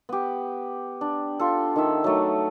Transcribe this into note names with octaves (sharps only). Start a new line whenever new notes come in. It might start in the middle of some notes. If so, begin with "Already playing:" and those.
B3 G4
D4
F4 A4
D#3 D#4 E5
F#3 A3